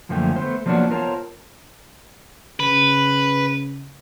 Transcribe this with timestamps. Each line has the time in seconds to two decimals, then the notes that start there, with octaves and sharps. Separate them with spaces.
0.09 F#2 D3 F3 A3 A#3 G5
0.36 A3 B3 C5
0.66 F3 F#3 A#3 B3 D4 F#4
0.90 B3 F4 A#4 C5 C#5 A5
2.60 C#3 B4